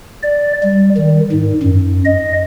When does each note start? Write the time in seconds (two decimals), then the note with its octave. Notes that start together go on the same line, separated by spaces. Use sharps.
0.23 D5
0.63 G3
0.97 D#3
1.32 G#2
1.63 F#2
2.05 D#5